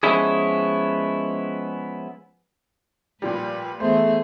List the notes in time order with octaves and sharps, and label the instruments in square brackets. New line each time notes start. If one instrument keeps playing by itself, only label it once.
[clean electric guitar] F3 G#3 B3 C#4 E4 G#4
[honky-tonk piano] A#2 F3 G3 [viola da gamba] B4
[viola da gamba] E3 B3 G#4 [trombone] A3 [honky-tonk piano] C5